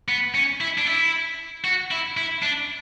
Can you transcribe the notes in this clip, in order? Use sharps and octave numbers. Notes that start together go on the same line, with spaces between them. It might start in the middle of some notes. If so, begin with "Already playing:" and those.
B3
C#4
E4
D4
E4
F#4
E4
E4
D4